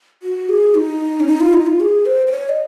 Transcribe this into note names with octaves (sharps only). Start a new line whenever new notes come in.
F#4
G#4
D#4
C#4
D#4
F4
D#4
F4
G#4
C5
C5
C#5
D#5